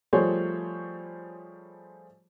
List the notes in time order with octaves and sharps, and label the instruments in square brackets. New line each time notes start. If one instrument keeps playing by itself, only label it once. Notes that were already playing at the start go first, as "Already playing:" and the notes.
[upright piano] F3 G3 A3 G#4 C5 C#5